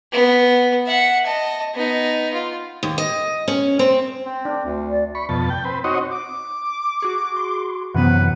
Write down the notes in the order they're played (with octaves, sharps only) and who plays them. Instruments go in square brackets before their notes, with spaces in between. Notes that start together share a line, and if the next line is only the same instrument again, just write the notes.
[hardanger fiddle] B3
E5 F#5
D#5 A5
B3 D#4
F4
[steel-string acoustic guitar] D#2
D#5
C#4
C4
[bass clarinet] C4
[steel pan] D4
[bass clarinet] D2
[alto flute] D5
[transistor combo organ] B5 C#6
F2 B2 A5
G5
C4 B4
C4 D#4 F#4 C#5 D#5
[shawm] D6
[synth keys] F#4 G#4 C#6
[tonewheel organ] C6
[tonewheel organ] F#2 E3 F#5 [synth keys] C3 F#3 B3 [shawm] B4